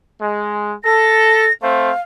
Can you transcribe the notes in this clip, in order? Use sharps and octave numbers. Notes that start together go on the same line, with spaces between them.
G#3
A4 A#6
A3 C4 C5 F5